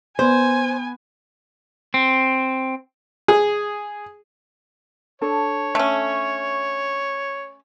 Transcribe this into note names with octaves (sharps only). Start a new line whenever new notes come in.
B3 C5 G#5
C4
G#4
D4 A4 C#5 A5
A3 C#4